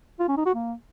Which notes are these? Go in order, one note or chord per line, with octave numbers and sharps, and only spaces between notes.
F4
C#4
D#4
F#4
A#3